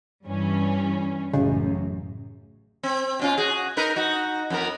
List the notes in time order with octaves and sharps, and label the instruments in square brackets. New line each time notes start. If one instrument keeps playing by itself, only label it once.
[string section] G2 E3 C#4
[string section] A1 F#2 [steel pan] C#3
[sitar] C4
B2 C#4 F4
F#4 G#4
D#4 A#4 B4
D#4 F#4
F2 B3 A#4